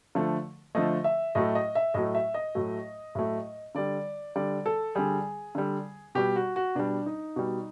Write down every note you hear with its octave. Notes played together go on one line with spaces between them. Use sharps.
D3 F3 A3
D3 F3 A3 D#5
E5
A2 F#3 A3 D#5
D#5
E5
A2 F#3 A3 D#5
E5
D#5
A2 F#3 A3
A2 F#3 A3
D3 G3 D5
D3 G3 D5
A4
D3 G3 G#4
D3 G3
B2 G3 G4
F#4
F#4
B2 G3 D4
D#4
B2 G3